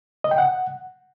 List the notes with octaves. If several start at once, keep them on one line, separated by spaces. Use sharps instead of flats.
D#5
G5
F#5